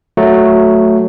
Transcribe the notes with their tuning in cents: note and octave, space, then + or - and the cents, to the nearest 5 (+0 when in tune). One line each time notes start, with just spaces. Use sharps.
F#3 +0 A3 +0